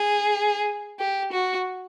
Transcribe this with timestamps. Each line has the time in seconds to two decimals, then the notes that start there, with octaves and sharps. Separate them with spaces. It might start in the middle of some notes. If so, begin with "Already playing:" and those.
Already playing: G#4
0.99 G4
1.32 F#4